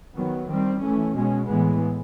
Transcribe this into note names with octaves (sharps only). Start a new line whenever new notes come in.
D#3 F#3 B3
D#3 G3 C4
E3 A3 C#4
B2 G#3 C#4
A2 E3 G#3 B3